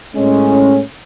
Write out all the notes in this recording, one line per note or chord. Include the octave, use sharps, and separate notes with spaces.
A2 G#3 C#4